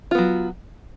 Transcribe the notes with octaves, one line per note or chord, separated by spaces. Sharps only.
F#3 B3 F4